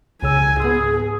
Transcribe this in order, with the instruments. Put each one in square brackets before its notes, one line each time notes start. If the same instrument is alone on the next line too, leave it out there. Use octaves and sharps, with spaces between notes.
[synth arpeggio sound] C#2 C#3 E6 [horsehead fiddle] G#5
[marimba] G#2 G#6 [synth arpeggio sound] B3 E6 [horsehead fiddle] G#4